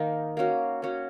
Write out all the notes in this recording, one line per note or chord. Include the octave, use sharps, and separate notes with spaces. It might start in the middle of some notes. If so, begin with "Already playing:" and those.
Already playing: D#3 A#3 D#4
A#3 C#4 F#4
A#3 C#4 F#4